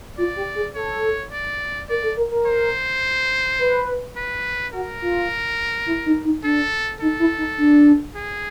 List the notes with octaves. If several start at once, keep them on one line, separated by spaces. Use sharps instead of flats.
F4 D5
G4
G#4
A4 C#5
D5
A#4 D5
A4
A#4
A#4
C5
B4
B4
F#4 A#4
F4
E4
D#4
D#4
D4 A4
D#4 A4
E4
D#4
D4
G#4